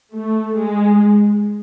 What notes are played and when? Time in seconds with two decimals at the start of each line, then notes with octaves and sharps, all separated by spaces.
0.13 A3
0.57 G#3